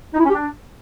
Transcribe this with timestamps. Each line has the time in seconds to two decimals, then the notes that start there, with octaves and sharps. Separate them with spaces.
0.14 D#4
0.19 E4
0.24 C#4
0.29 G4
0.34 D4